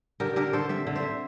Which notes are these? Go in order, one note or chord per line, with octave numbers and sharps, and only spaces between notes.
D3 G4 A#4
D3 G4 A#4
D3 A4 C5
C4 C5 E5
D3
C5 E5
D3